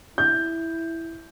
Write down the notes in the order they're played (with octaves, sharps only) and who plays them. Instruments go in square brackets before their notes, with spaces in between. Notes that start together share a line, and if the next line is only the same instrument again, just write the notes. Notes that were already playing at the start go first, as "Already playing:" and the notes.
[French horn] E4 [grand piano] G6